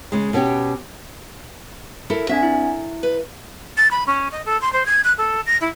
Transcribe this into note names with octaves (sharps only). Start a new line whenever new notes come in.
C#3 G#3
B2 B3 C#4 G4
E4 A4 A#4
C4 D4 E5 G#5
E4
B4
A6
B5
C#4
D#5
A4
C6
C5
G#6
F#6
A4
A#6
E4